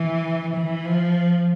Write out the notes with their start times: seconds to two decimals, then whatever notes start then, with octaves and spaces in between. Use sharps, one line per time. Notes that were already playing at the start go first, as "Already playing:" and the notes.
Already playing: E3
0.56 E3
0.85 F3